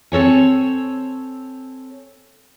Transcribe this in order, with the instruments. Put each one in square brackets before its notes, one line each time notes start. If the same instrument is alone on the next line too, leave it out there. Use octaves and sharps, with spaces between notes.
[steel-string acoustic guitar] C4 A4 C#5 G#5